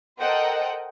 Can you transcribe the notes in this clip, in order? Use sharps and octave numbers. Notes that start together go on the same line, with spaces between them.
A4 A#4 C5 D#5 F#5 G5